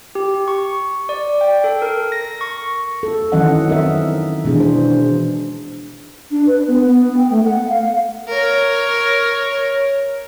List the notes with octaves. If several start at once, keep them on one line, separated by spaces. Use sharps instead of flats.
G4
C#6
D5
G5
A4
A#4
A#6
C#6
A4
D#3 E3 F#3 C#4 D#5 F#5
C4 D#4 A#4 D#5 E5
B2 E3 G#3 D4 G#4
C5
D4
B4
B3
B3
G5
A3
F#5
F5
A#4 C#5